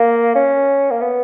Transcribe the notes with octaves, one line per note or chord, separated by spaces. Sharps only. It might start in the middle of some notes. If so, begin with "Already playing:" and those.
Already playing: A#3
C#4
A#3
B3